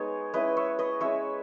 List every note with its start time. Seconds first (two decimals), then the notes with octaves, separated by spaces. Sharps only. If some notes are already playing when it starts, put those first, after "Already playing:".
Already playing: G#3 B3 D#4 C#5
0.34 G#3 C#4 E4 B4 D#5
0.57 C#5 E5
0.79 B4 D#5
1.01 G#3 C#4 E4 C#5 E5